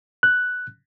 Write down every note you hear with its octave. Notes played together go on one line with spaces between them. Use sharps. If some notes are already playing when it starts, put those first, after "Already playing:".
F#6